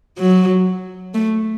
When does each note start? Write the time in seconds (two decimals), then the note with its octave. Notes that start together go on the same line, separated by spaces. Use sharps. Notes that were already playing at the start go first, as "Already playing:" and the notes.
0.19 F#3
1.14 A3